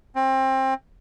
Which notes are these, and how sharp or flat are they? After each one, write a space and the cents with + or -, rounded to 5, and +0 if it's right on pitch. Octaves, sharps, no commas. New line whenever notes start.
C4 +25